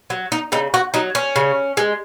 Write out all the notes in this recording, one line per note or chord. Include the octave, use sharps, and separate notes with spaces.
F#3
D#4
C#3 D#4
F#4
F#3 D#4
C#4
C#3
G#3